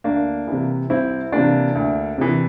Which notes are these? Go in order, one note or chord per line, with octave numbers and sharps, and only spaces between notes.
D2 A#3 D4
C3 E3
C2 C4 E4
C3 E3 A#3 D4
D2
C3 E3